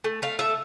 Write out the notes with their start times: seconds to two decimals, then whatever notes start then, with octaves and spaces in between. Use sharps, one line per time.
0.04 A3
0.22 A3 F5
0.39 A3 E5